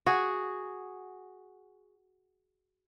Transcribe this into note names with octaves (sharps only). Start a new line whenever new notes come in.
F#4 G#4